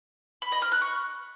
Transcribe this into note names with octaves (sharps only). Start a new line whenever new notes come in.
B5
D#5
F6
F#6
C#6